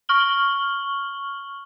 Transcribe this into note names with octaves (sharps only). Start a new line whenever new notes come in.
C#6 F6 F#7 G7